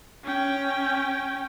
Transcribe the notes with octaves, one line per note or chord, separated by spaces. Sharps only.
C#4 G5